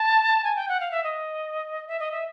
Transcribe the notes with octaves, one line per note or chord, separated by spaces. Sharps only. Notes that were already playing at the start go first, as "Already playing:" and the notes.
Already playing: A5
G#5
G5
F#5
F5
E5
D#5
E5
D#5
E5